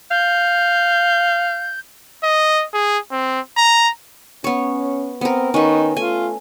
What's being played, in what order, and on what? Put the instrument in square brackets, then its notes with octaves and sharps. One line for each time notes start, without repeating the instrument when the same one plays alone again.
[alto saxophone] F5 [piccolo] G6
[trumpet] D#5
G#4
C4
A#5
[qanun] B3 C#5 [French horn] C#4
[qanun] B3 A#4 [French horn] C4
[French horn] D#3 [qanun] C#4 B4 [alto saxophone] D#4
[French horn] A3 [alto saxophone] F4 [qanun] G#5